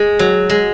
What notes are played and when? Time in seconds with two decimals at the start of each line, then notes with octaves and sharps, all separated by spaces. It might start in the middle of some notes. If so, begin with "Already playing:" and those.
Already playing: G#3
0.19 F#3
0.50 G#3